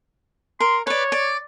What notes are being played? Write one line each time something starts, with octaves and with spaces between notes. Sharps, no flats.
A#4 C6
B4 C#5 D5
D5